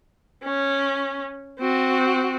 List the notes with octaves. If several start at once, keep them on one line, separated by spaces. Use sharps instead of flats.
C#4
C4 F#4